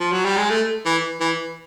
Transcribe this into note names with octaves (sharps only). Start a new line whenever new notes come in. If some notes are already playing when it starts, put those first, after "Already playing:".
F3
F#3
G3
G#3
A3
E3
E3